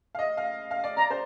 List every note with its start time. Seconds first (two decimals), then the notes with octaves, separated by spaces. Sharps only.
0.15 F5
0.19 D#5
0.37 F5
0.71 F5
0.84 D5
0.97 D5 A#5
1.10 C5